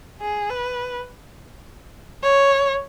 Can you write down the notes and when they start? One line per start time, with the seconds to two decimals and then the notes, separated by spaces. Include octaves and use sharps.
0.21 G#4
0.50 B4
2.23 C#5